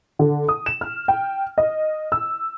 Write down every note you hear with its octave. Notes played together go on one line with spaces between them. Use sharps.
D3
D#6
E7
F6
G5
D#5
E6